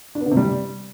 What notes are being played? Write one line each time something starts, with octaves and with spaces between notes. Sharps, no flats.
D4
B3
D3
C3
G3